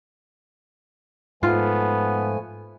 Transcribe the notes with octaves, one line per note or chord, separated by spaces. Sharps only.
G#2 F3 A3 B3 F4 G#5